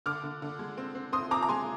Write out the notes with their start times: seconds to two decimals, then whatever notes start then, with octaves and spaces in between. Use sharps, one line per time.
0.06 D3 D6 F6
0.24 D3
0.42 D3
0.59 G#3
0.77 C4
0.95 C4
1.12 C4 C6 D#6
1.31 C4 A#5 D6
1.43 A#5
1.49 G#3 G#5 C6